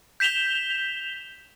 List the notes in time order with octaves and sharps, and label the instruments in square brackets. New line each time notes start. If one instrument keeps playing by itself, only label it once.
[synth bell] G6 B6 E7 F7 G7